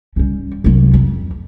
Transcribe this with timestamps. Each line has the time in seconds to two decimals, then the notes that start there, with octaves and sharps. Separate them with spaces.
0.16 G3 C#4
0.64 C2 F#3
0.93 F2